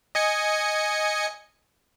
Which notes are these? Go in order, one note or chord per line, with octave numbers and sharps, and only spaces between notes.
D#5 G#5 C#7